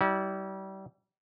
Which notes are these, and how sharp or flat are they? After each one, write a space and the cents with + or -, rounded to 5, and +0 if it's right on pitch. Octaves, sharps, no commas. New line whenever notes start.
G3 -30 E4 -40